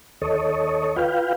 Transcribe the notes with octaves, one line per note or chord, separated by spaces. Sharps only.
D#2 A4 C#5 D#5
F4 B4 F5 G5